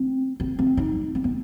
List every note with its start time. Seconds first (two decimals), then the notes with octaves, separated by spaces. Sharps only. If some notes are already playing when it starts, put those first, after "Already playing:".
Already playing: C4
0.40 C4
0.59 C4
0.77 D#4
1.15 C4
1.24 B3